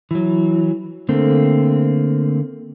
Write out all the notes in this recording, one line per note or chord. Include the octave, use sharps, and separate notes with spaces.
E3 F#3
D3 A3 A#3 C4